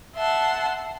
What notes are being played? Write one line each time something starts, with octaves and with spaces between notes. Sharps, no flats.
E5 F#5 A5 C6